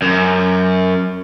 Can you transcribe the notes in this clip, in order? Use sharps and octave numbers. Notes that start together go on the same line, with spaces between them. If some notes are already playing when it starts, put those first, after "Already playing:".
F#2